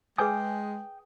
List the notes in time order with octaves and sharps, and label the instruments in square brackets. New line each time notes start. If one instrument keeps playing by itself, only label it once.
[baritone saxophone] G#3 [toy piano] G#4 B4 G#5 [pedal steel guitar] G5 D#6